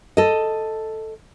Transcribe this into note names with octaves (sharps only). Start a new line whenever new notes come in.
A4 D#5